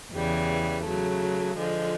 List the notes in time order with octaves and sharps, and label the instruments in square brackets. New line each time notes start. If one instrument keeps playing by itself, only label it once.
[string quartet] E2 C#3 E3 G3
C#3 F#3 A3
D3 F3 G#3